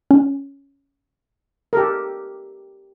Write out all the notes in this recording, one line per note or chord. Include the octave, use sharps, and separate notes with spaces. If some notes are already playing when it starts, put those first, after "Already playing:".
C#4
G4 A4 A#4